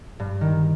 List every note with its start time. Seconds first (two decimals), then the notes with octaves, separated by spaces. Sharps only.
0.20 G2
0.41 D#3